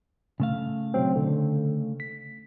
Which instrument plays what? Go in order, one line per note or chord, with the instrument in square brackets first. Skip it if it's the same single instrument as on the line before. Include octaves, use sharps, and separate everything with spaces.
[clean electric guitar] C#3 A3 F5
[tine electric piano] B2 F#3 C4
D3
B6